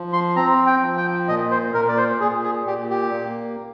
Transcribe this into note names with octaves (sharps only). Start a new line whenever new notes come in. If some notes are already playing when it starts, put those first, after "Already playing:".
Already playing: F3
C6
C4 A#5
G5
F3
G5
A#2 D#5
C5
A#2 A#4
D5
C5
A#2 G#4
G#4
A#2 G4
G4
A#3